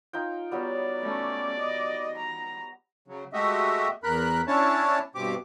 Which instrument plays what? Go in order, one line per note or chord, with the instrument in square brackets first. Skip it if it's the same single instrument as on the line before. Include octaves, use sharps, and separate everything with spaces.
[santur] D#4 F4 G5
[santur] F#3 G3 B3 [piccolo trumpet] D5
[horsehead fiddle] A3 C#4
D#5
A#5
[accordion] C#3 F#3
G#3 A3 F#4 G4 D#5 E5
E2 A#4 B5 F#6
C#4 D4 E4 C#5 A5
G2 B2 C4 G4 D6